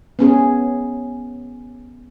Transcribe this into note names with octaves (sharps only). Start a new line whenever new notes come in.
B3 C#4 G#4